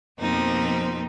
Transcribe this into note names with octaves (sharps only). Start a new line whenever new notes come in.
F2 B2 F3 A#3 C4 D#4